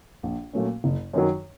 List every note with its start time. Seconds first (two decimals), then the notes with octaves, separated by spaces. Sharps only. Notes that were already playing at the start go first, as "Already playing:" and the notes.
0.23 A#1
0.53 A#2 F#3 A3 C#4
0.84 F#1
1.13 F#2 D#3 F#3